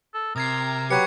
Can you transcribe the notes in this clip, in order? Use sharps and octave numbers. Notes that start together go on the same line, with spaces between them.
A4
C3 A#4 D#6 G#6 C7
F#3 G4 B4 C#6 G#6 C#7